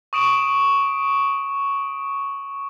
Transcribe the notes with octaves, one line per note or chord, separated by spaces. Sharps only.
C#6 D#6 D7 E7 F#7